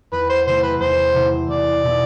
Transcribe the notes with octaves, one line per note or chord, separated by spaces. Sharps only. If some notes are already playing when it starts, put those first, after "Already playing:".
E2 B4
C5
C3 E3 A3 C5
B4
E2 C5
C3 E3 A3
E2 D5
B2 B3 E4